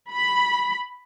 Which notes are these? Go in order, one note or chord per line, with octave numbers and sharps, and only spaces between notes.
B5